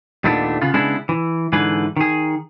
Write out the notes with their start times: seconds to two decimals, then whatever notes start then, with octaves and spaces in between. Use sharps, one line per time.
0.24 D#2 A#2 A3 B3 D4
0.62 C#3 B3 F4
0.74 C#3 G#3 B3 D4 E4 G#4
1.09 E3
1.53 G#2 D3 E3 G#4 B4
1.97 D#3 G#4